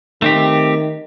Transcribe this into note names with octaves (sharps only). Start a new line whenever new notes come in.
D#3 A3 C4 G4